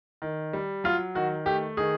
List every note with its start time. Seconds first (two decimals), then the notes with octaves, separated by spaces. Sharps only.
0.22 D#3
0.53 G3
0.84 F#3 F4
1.15 D#3 F#4
1.46 A3 G4
1.77 D#3 G#4